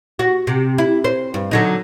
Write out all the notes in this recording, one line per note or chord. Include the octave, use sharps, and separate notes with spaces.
F#4
C3
E4
C5
G2
D3 F#3 D#4